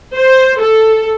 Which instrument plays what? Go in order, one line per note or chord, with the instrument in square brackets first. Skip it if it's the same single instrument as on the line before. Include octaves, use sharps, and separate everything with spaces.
[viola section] C5
A4